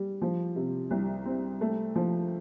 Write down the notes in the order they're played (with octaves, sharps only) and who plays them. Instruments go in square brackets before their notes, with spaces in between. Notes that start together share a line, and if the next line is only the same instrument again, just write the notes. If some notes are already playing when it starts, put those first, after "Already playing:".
Already playing: [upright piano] G3
F3
C3
C2
C4
A3
F3